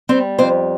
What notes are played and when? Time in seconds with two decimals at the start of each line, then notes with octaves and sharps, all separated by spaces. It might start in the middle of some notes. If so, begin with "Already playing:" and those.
0.09 G3 C4 C5
0.39 F2 C4 C5